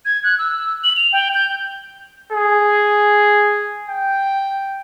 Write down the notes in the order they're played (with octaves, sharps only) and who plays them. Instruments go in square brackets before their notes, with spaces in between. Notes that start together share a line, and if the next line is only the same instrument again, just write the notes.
[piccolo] G#6
F#6
E6
F#7
F7
G5
G6
[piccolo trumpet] G#4
G5